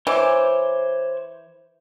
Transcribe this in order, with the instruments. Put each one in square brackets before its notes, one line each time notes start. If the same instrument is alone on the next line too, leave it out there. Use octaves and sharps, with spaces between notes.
[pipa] E3 [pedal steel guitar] C5 C#5 D6